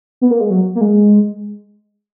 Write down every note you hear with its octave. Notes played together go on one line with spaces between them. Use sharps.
B3
A#3
G#3
F#3
A#3
G#3